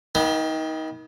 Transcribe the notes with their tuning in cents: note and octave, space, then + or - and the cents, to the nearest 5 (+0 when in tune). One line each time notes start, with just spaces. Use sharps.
D#3 +30 B3 -25